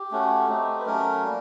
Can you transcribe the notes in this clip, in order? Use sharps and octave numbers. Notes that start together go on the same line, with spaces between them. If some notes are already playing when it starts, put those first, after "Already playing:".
Already playing: G4
A3 C#4 F#4
A3 C4 D#4
B4
F#3 A3 C#4 A#4
G3 A#3